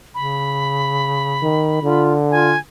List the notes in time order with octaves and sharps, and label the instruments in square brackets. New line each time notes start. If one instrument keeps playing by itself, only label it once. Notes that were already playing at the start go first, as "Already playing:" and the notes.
[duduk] C#3 [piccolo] B5
[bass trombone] D#3
[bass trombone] D3 [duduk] F4
[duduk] F4 [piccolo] G#5